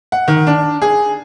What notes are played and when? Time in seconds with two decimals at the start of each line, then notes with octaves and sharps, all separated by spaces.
0.12 F#5
0.28 D#3
0.47 D4
0.82 G#4